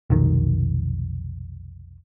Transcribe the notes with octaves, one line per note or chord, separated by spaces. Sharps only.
F1 B1 D#3